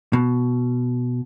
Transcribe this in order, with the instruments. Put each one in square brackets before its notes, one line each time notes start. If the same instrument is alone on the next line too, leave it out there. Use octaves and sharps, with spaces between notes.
[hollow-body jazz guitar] B2